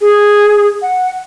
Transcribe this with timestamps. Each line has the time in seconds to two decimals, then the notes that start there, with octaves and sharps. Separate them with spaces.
0.01 G#4
0.82 F#5